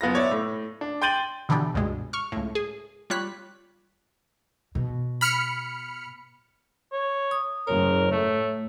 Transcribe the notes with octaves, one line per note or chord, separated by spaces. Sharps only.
F#1 B3 F4 A#6
C#5 D5 E5
A2
D4
G5 C6 G6 A6 D#7 F#7
B2 D3 E3 D4 G4
C#2 G2 B2 G#3
C#6 F6
C#2 A2
G#4
G3 F4 C#5 F#6 B6
B2
B5 F6 C#7
C#5
D#6
F#1 A#4 C#5
A2 A3